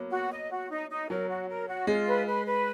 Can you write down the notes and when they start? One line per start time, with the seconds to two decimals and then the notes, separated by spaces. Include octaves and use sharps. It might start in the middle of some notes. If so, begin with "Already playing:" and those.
Already playing: F#3 A#3 B3
0.11 F#4
0.31 D#5
0.50 F#4
0.70 D#4
0.90 D#4
1.09 F#3 A#4
1.29 F#4
1.49 A#4
1.68 F#4
1.87 G#3 F4
2.07 B4
2.27 B4
2.47 B4